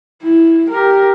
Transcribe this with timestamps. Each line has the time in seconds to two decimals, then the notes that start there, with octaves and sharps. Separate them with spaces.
0.22 E4
0.69 G4 A#4